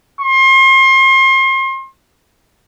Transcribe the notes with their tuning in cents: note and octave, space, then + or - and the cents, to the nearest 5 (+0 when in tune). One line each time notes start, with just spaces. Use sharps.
C6 +35